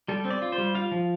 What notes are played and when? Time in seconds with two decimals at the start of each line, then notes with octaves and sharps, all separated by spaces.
0.08 G3 A4
0.25 C4
0.30 D5
0.42 F4
0.52 C5
0.58 G3
0.75 F4 F5
0.92 F3